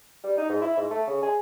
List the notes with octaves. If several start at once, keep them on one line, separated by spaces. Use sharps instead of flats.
G3
D#4
G#2
E4
G#2
A3
C#3
G#4